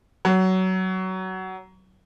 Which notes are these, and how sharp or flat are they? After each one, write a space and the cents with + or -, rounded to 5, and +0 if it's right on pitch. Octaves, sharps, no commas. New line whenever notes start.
F#3 +20